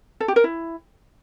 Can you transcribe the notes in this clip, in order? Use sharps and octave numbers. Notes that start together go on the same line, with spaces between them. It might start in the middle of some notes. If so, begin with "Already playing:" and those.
A4
G4
A#4
E4